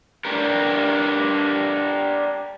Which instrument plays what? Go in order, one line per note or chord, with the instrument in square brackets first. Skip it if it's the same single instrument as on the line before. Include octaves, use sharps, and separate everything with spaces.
[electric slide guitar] D4 G4 A#4